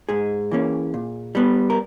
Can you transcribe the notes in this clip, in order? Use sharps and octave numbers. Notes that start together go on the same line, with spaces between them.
G#2 G#4
E3 A#3 C#4
A#2
G3 B3
A#4